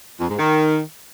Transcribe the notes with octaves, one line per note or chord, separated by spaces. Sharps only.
F2
G#2
D#3